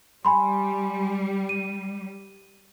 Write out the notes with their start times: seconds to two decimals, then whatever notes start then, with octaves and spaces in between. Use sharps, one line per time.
0.25 G3 G#5 B5 C6
1.49 D#7